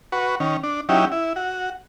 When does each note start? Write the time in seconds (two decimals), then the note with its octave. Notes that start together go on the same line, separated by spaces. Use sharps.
0.12 F#4 B4 C#6
0.40 D#3 C#4
0.63 D4
0.89 F#3 C#4 D#4 E4 G4
1.12 E4
1.36 F#4